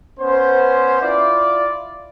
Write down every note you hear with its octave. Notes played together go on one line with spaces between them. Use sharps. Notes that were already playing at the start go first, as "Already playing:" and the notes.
B3 C#4 C5
E4 F4 D5